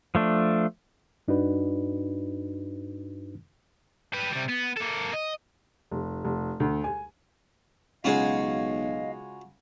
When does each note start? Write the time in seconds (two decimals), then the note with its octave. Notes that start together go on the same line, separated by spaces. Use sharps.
0.15 F3 A3 D4
1.28 G2 D4 D#4 F#4 B4
4.14 G4 B4
4.33 C3 G3
4.49 B3
4.77 A#3 A4
5.13 D#5
5.91 F1
6.24 F1
6.60 D2
6.84 G#5
8.04 B1 C#3 G#3 F4 F#4 G#4 D#5 F5